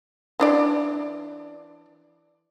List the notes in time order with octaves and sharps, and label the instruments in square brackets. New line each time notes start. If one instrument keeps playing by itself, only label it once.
[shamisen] E3 D4 D5